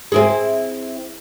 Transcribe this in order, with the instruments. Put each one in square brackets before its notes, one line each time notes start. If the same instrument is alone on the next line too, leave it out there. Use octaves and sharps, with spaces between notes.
[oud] C4 E4 G#4